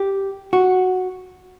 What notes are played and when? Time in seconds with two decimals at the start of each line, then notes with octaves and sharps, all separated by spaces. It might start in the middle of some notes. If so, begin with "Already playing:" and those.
Already playing: G4
0.53 F#4